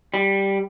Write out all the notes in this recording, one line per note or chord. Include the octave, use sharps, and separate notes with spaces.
G3